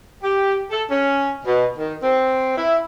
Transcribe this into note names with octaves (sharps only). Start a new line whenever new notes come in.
G4
A4
C#4
B2
D#3
C4
E4